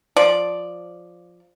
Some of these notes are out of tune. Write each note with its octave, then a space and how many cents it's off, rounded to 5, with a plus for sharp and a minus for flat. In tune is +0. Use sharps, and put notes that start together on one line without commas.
F3 +5 D5 +0